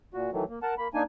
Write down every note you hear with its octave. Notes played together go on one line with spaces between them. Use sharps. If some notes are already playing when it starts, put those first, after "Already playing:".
A#2 F#4
D#3 E3 F#3 A3
A#3
A#4 F#5 A5
A#3 B5
A#3 D4 D#4 G#5